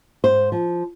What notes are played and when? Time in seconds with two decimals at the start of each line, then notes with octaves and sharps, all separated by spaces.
0.24 G#2 C5
0.52 F3